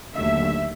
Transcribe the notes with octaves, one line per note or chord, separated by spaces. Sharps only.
D#2 D3 F#3 A3 E5